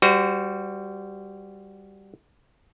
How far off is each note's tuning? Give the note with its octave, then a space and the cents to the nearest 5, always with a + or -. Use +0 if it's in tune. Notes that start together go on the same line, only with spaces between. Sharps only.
G3 +0 F#4 +0 C5 -35